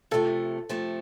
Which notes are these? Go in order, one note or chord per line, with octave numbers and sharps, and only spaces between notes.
C3 F3 A3 A4
C3 F3 A3